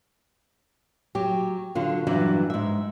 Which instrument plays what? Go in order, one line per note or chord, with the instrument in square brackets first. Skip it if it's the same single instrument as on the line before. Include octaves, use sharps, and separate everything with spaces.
[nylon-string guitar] F#3 G4
D3 F#3 F4
G2 E3 F#3 D4 E5
G#2 E5